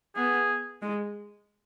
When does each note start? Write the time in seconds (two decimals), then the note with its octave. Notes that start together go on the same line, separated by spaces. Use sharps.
0.15 B3 G#4
0.82 G#3